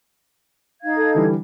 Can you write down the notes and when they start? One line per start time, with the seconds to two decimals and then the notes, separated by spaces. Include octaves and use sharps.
0.82 D#4 F5 G#6
0.96 A4
1.15 D3 E3 G3